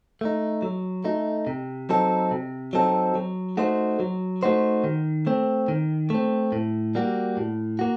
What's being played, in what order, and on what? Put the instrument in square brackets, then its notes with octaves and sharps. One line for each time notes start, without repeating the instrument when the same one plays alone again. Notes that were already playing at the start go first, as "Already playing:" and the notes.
[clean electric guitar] A3 D#4
F#3
A3 D#4
C3
F#3 C4 D#4 A4
C3
F#3 C4 D#4 A4
F#3
A3 D#4 F#4 C5
F#3
A3 D#4 F#4 C5
D#3
A3 C4
D#3
A3 C4
A2
G3 A#3 F#4
A2
A#3 F#4